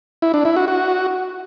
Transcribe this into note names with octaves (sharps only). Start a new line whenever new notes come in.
E4
D4
E4
F#4
F#4